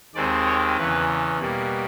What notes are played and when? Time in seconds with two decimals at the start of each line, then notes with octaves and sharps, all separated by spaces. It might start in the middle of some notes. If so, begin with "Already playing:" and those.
0.15 D#2 D#3 G#3 C4 D5
0.46 C#5
0.77 E2 C#3 E3 B4
1.38 B2 G3 A#3